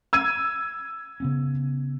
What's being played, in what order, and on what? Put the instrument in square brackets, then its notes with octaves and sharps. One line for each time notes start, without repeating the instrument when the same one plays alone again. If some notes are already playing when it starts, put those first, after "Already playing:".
[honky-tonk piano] E6 G#6 D#7
[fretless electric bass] C#3 B3 C#4